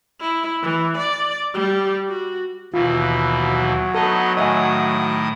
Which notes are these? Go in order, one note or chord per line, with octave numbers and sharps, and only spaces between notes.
E4
E3
D5
G3
F#4
D#2 B2 E3 F4
F#3
B3 D#4 A4 D#5
A2 D#3 D#5 E5 G#5 D#6